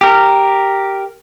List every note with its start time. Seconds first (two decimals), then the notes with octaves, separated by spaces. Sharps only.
0.01 G4 A#4